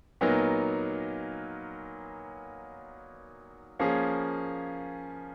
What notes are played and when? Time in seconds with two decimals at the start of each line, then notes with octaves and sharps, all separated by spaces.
0.21 A#2 F#3 B3 D#4 A#4
3.79 F3 A#3 C#4 G#4